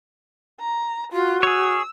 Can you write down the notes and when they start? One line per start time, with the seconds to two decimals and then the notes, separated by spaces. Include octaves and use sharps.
0.60 A#5
1.13 F4 F#4
1.43 G#4 C#5 E6